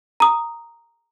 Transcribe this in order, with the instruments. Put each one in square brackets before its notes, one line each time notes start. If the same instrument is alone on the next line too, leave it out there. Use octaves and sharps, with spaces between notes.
[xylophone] A#5 D#6